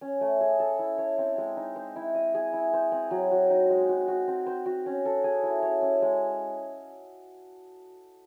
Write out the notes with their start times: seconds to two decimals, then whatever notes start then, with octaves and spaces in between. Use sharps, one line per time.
0.01 C#4
0.21 A3
0.41 G#4
0.60 A4
0.79 E4
0.98 C#5
1.18 C4
1.38 G#3
1.57 D#4
1.76 C5
1.96 E4
2.15 D#5
2.34 G#4
2.53 E4
2.73 C5
2.92 C4
3.11 F#3
3.31 F#4
3.50 D#4
3.70 G#3
3.89 F#4
4.08 F#4
4.28 C4
4.46 C5
4.66 F#4
4.86 C#4
5.05 A4
5.24 G#4
5.43 E4
5.62 C#5
5.82 C#4
6.02 G#3